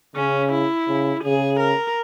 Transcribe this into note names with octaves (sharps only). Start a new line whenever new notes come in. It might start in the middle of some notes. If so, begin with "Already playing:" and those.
C#3 C#4
E4
C#3
C#3 G#4
A#4